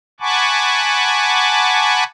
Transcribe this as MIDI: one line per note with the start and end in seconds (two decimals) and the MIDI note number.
0.20 2.04 78
0.20 2.04 80
0.20 2.04 81
0.20 2.04 83
0.20 2.04 85
0.20 2.04 86